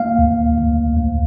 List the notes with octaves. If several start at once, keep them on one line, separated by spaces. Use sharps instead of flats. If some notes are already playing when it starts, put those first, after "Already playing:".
Already playing: A#3 F5
D2
D2
D2